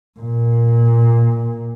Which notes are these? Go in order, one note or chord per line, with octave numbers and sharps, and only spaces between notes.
A#2